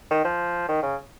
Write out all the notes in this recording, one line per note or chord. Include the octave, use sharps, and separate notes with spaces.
D#3
F3
D#3
C#3